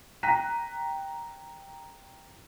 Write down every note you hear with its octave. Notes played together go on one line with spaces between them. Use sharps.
G5 A#5 F#6 A#6 B6 D#7